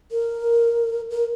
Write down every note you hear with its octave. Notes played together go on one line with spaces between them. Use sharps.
A#4
A#4